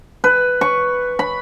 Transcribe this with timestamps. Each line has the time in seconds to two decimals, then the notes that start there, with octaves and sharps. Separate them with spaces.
0.24 B4
0.61 C#6
1.19 B5